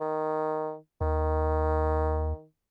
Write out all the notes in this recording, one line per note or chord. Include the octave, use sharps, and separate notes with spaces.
D#3
D#2 D#3